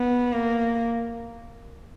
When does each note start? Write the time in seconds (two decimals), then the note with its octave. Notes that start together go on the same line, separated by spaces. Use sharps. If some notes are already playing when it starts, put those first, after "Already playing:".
Already playing: B3
0.33 A#3